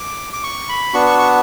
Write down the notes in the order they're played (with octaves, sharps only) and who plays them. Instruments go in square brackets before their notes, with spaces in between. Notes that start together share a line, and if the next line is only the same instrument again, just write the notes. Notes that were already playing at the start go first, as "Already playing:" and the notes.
Already playing: [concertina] D6
D6
C#6
B5
B3 D4 F#4 C#6
C#6
C#6